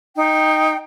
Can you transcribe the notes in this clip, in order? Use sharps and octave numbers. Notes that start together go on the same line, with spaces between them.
D#4 G5